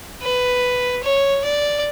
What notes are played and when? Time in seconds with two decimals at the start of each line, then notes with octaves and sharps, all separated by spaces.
0.22 B4
1.03 C#5
1.44 D5